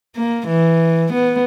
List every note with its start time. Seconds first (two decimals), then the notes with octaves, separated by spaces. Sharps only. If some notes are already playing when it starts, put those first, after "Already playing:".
0.16 A#3
0.48 E3
1.13 B3